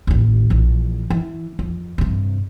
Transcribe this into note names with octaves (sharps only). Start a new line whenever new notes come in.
A1 D#2
A#1 E3
E3
F2
G2 C3